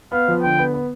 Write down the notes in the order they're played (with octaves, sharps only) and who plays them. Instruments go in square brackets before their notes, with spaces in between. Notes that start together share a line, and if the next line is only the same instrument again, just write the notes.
[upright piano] B3 [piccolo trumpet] F5
[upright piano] F3
[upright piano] D3 [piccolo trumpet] G5
[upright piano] B3
B3